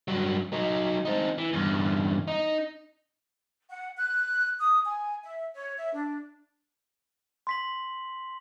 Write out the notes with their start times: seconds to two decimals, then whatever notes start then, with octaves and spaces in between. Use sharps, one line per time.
0.08 G2 F#3
0.53 F#3 D#4
1.05 C4 D#4
1.38 E3
1.53 E2 G2
2.28 D#4
3.70 F#5
3.97 F#6
4.58 D#6
4.84 G#5
5.23 E5
5.56 C#5
5.77 E5
5.93 D4
7.47 C6 B6 F#7